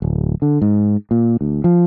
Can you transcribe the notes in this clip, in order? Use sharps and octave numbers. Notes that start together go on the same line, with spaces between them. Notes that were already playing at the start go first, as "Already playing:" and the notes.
D1
D3
G#2
A#2
D2
F3